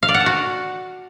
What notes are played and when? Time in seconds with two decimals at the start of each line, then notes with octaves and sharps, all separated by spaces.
0.03 F5
0.09 D5
0.14 F#5
0.20 A5
0.26 F#4